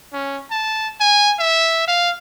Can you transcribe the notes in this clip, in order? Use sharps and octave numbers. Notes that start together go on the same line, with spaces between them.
C#4
A5
G#5
E5
F5